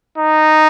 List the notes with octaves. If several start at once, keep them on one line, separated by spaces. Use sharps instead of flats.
D#4